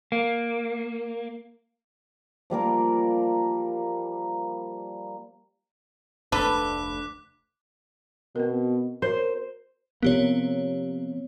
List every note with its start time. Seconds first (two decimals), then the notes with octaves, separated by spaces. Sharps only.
0.12 A#3
2.50 F3 G3 A#3 A#4
6.32 F1 D2 D4 A4 B4 D6 F#6 B6
8.36 B2 B3 C4 A#4
9.02 F#4 A#4 C5 C#5
10.03 C3 F3 A#3 B3 G4 C#5